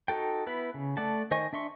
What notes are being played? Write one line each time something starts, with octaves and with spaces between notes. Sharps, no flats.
D#4 F#4 A4 G5
B3 E4 B4 B5
C#3
A3 D5 F#5 A5
D#3 C5 D#5 G#5 C#6
D4 E5 C6 C#6